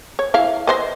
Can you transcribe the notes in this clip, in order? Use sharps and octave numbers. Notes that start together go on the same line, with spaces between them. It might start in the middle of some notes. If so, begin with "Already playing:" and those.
C#5
E4 E5 F5
B4 C5 D#5